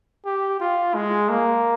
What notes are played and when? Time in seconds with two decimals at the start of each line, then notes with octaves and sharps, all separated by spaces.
0.26 G4
0.60 F4
0.95 G#3
1.29 A#3